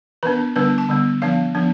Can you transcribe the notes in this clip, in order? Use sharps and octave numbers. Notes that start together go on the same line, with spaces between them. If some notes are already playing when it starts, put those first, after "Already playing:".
E3 B3 D4 B4
D3 G3 B3 D4 B4
A5
D3 G3 B3
F3 B3 D4 F5
F3 B3 D4